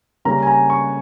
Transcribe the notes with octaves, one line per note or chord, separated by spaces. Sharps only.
C#3 G3 A#3 C#4 A#5
G#5
A#5
C#6